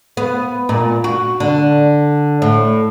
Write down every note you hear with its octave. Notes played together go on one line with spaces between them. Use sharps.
B3
A#2
F#4
D3
A2